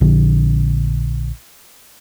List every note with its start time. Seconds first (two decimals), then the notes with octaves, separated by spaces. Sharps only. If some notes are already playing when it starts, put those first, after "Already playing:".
0.01 A#1 D3